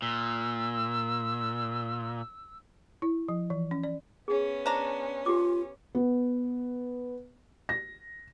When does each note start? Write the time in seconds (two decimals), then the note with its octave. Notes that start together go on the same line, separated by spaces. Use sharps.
0.02 A#2 E6
3.02 E4
3.29 F3
3.50 E3
3.71 C#4
3.84 D5
4.28 B3 C#4 G#4
4.66 D4 C5 A#5
5.26 F4 G4 D6
5.95 B3
7.69 A#6